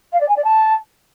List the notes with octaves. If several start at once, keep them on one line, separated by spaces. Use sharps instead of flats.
F5
D5
G#5
D5
A5